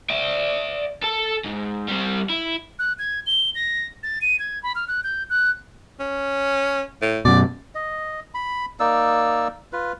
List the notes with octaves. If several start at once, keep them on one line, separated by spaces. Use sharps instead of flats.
D5 E5
A4 A5
G#2
G3 C4
E4
F#6
G#6
G7
A#6
A6
D#7
G#6
B5
F6
F#6
G6
F#6
C#4
A2
F#2 B2 D5
D#5
B5
A#3 D#4 D5 E6
F4 B4